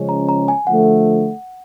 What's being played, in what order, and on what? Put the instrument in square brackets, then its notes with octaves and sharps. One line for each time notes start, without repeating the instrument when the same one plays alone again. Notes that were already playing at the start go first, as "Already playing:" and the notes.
Already playing: [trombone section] C#3 F3 G#3 C#4
[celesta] A#5
A#5
G#5
[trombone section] D3 F3 A3 [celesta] F#5